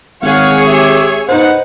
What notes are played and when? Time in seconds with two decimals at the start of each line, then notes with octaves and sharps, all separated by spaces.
0.22 G#1 G#4 C#5 F5 F#5
0.67 G4 E5
1.29 D#4 B4 C5 F#5